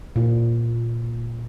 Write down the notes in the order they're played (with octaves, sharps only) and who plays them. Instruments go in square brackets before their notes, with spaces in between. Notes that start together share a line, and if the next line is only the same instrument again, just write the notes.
[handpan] A#2